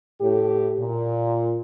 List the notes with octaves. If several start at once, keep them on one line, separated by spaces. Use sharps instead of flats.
A2 G4
A#2